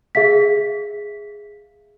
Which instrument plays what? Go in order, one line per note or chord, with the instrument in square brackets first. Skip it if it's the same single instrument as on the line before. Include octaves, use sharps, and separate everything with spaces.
[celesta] G#4 E5 F5 B6